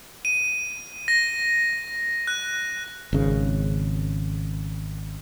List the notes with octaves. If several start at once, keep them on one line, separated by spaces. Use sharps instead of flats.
D#7
A#6
F#6
G#1 C#3